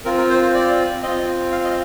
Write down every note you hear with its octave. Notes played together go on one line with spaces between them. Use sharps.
C4 F4 A#4
A#4
C5
C5
D5
C4 F4 D#5
F5
D#5